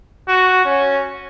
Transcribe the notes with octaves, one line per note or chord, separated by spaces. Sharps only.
F#4
C#4